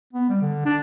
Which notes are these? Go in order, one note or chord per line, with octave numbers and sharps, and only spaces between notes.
B3
G3
D3
D4